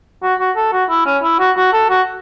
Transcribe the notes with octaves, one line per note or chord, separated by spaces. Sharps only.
F#4
F#4
A4
F#4
E4
C#4
E4
F#4
F#4
A4
F#4